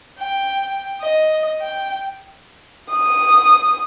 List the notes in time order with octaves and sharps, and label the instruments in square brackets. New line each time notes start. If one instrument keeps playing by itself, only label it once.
[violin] G5
D#5
G5
[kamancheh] D#6